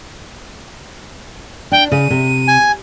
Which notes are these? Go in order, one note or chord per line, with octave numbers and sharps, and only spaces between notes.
D4 G5
C#3 D#7
C3
G#5